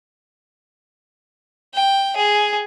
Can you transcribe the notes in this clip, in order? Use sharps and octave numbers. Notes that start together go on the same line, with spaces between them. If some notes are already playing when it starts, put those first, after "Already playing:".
G5
G#4